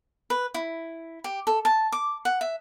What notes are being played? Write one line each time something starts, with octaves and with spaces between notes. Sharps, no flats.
B4
E4
G4
A4
A5
D6
F#5
E5